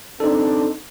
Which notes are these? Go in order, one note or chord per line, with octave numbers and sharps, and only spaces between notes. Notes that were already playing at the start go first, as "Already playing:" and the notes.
C4 D4 D#4 A4